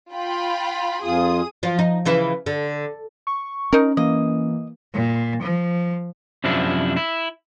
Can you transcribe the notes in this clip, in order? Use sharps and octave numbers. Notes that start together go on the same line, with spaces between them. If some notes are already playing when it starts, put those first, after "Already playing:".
F4 G5 B5
F2 F4 G#4 D#6
F3 F4
D#4
C#3 E3 E4
D3
C#6
C#4 D#4 A#4
E3 A#3 D#5
A#2
F3
F#2 C3 F3 D4 E4
E4